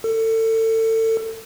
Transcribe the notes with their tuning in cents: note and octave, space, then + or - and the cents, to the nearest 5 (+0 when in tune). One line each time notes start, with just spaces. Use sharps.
A4 +30